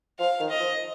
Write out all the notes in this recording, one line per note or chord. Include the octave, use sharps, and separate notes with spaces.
F3 F5
D#3
D#5
F3